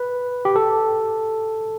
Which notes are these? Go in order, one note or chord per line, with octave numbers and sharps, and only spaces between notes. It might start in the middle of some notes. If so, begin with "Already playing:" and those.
Already playing: B4
G4
A4